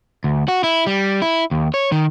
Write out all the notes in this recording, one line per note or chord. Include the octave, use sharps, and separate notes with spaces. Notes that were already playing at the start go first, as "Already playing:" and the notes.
D2
F#4
E4
G3
E4
D#2
C#5
D#3